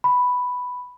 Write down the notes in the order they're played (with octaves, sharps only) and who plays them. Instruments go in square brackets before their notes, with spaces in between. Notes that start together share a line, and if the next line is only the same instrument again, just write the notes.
[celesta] B5